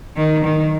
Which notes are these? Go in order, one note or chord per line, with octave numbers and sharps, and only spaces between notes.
D#3
D#3